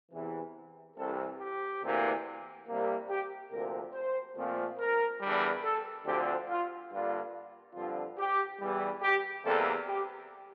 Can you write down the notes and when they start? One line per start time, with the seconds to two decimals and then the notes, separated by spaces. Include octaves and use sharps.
0.12 E2 C3 E3
0.97 C2 C3 E3 A4
1.40 G4
1.82 D2 C3 E3 A#3
2.67 C2 C3 G3 A#3
3.09 G4
3.51 D2 C3 F3 A#3 A#4
3.93 C5
4.36 A#2 F3 A3 C4
4.79 A#4
5.21 E2 D3 G3
5.63 A4
6.05 D2 D3 F3 C4 G4
6.48 F4
6.90 G2 D3 G3 A#3 F4
7.75 G2 D3 F3 C4 F4
8.18 G4
8.60 E2 E3 G3
9.03 G4
9.45 E2 C3 G3 A#3 A4
9.87 G4